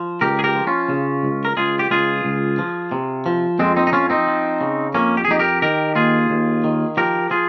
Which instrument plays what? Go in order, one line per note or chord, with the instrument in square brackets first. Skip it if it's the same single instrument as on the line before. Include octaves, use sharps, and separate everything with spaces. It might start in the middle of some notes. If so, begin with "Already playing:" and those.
Already playing: [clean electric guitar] F3
C#2 G4 A#4
G#4
G4 A#4
F3
C#4 F4
C#3
C#2
A#4
C#2 F4 G#4
G4
C#2 F4 G#4
C#2
F3
C3
F3
F2 G#3 C4
C4 D#4
D#4
F3 C#4 F4
C4 D#4
F3
C#3
F2 A#3 C#4
G4
G#4
F2 D#4 G4
G4 A#4
D#3 G4 A#4
D#2 F4 G#4
D#2
D#3
F3 G4 A#4
F3 F4 G#4